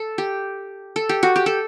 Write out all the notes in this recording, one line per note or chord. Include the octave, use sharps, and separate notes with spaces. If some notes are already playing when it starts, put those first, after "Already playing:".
Already playing: A4
G4
A4
G4
F#4
G4
A4